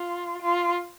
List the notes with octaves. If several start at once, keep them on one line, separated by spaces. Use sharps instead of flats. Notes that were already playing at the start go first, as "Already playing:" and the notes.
Already playing: F4
F4